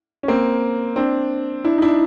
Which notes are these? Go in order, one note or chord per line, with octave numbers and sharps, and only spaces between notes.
C#4
A#3 C4
C4 D4
D4 E4
D#4
D4 E4